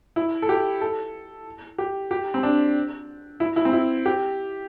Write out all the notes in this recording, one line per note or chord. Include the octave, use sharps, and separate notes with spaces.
E4
A4
G4
A4
G4
G4
C4
D4
E4
E4
C4
E4
G4